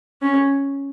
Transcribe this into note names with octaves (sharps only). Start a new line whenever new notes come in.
C#4